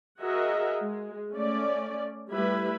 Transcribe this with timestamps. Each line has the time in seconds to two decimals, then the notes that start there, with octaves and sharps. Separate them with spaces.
0.21 F#4 G#4 A#4 D#5 E5 F#5
0.80 G#3
1.31 A3 C#4 D5
2.33 G3 A3 E4 B4 B5